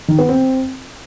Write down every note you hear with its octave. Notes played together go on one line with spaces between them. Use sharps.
D#3
B3
C4